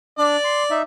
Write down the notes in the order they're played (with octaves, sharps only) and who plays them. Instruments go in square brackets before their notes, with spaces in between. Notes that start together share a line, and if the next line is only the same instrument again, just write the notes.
[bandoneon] D4 [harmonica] D5
[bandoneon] C6
D#4 E5